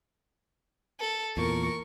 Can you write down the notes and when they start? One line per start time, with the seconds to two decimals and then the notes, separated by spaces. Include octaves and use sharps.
1.00 A4
1.37 E2 A#2 A#4 C#6